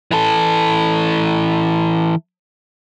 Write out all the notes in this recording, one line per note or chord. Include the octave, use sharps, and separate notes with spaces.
E3 A4